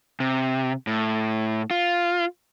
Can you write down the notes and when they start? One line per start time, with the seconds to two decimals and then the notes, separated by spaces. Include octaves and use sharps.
0.20 C3
0.87 A2
1.71 F4